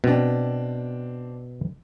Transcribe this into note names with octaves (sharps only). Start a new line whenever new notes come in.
B2 C4 D4